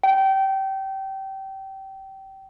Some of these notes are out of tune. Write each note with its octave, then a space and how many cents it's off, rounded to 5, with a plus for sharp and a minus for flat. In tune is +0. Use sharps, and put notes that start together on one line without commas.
G5 -25